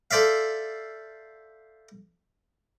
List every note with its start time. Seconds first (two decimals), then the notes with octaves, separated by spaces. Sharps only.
0.11 A4 C5 D5 E5 F5